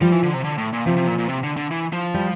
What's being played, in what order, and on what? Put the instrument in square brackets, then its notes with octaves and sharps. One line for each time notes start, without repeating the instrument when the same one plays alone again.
[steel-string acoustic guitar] F3 [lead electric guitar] G3
[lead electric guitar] E3
D3
C3
D3
A2
A#2
[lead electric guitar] C3 [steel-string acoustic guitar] F3
[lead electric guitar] C3
A#2
A#2
C3
D3
D3
E3
F3
[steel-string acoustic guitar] G3